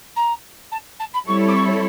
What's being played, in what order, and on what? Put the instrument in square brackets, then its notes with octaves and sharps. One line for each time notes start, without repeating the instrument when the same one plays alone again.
[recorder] A#5
A5
A5
B5
[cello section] G3 C4 E4 A4 C#5 [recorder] C#6
[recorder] D6
C#6